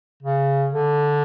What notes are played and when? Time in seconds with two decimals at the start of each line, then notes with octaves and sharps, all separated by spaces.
0.23 C#3
0.71 D3